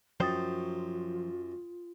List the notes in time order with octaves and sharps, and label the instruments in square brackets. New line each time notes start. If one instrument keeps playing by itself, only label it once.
[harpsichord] F#2 [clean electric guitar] F3 F#3 C5 [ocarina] F4 [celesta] G5 D#6 A6